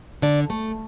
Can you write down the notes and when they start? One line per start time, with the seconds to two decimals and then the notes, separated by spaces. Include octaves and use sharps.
0.22 D3 D5
0.50 A3